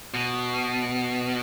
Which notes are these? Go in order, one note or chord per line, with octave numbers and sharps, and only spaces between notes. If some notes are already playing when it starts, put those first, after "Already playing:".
B2